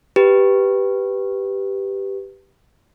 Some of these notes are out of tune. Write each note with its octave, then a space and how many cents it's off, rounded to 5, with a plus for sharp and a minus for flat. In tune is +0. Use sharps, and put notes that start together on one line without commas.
G4 +0 B4 +0